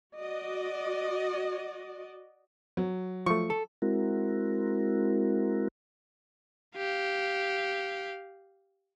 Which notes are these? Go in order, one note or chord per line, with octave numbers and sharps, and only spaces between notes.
F#4 D5 D#5
F#3
F3 A3 C#6
A4
G#3 C4 E4 F#4 A#4
G4 F5